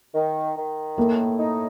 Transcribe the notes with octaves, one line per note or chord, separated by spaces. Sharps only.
D#3
D#3
A2 A#3
D#4